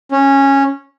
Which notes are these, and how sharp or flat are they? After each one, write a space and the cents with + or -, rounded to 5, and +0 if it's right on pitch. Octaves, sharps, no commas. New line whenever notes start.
C#4 -10